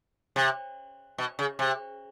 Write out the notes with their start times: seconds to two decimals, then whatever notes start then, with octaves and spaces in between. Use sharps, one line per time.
0.36 C3
1.18 B2
1.39 C#3
1.59 C3